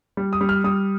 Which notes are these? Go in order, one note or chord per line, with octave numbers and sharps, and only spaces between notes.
G3
D#6
G3
F6
G3 D#6